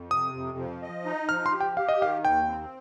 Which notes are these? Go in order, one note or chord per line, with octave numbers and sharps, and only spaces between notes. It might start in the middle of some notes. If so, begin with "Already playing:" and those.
Already playing: F2
C3 D#6
F2
F3
D#5
D#4
F3 F6
C6
G4
G5
G4 F5
D#5
D#3 F5
D#2 G5
C4